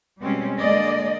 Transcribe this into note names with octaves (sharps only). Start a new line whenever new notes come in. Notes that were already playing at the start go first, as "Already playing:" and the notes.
B2 G3 G#3 C4 C#4
D3 G#3 A#3 D5 D#5